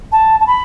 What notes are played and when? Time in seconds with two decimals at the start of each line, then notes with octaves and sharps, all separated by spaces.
0.12 A5
0.40 A5
0.47 B5